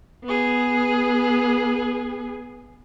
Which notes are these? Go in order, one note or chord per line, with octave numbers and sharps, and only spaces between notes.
B3 G#4